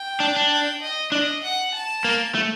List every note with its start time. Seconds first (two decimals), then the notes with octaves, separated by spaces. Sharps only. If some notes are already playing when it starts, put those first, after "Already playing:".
Already playing: G5
0.20 D4
0.37 D4
0.51 G5
0.82 D#5
1.12 D4 D#5
1.43 F#5
1.74 A5
2.05 A#3
2.35 A3